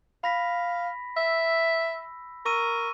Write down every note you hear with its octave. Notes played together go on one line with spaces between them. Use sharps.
F5 B5 A#6 B6
E5 E6
A#4 C#6 E6 D#7